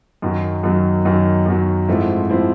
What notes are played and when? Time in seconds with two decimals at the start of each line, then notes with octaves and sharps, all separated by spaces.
0.22 F#2 D#3 F#3
0.63 F#2 D#3 F#3
1.05 F#2 D#3 F#3
1.46 F#2 D#3 F#3
1.88 G#2 F3 A3 C4 E4
2.29 F3 A3 C4 E4